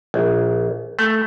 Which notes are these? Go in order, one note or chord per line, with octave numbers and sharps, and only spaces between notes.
A#1
A3